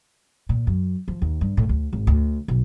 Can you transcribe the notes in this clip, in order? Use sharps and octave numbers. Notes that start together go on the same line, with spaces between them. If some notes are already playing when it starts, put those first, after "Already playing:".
A#2
F#2
F3
D#2
G2
A2
D2
G#1
D2
B1